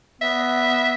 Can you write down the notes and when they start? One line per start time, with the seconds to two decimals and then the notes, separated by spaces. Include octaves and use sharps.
0.22 B3 E5